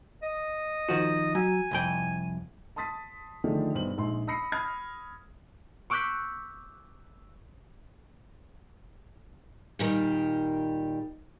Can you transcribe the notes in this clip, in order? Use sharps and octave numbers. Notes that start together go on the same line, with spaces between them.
D#5
D#3 F3 F#4
F#3 G#5
C2 F2 G5
A5 C6 D#6 A6 B6
D3 D#3 F3 A3 D4 G#4
B1 G2 C5 F#7
A#1 G#3 D#4 C6
B5 D#6 E6 A#6 C7 C#7
B5 D#6 F6 G#6
C#6 D6 E6 F#6 G6 B6
A#2 D#3 G3